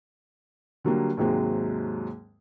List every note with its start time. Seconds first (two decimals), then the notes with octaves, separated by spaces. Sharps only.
0.85 D3 F#3 G3 A#3
1.17 D#2 G#2 C3 F#3 G#3